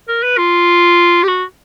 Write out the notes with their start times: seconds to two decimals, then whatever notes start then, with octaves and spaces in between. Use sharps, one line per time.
0.08 A#4
0.23 B4
0.38 F4
1.23 G4
1.28 F#4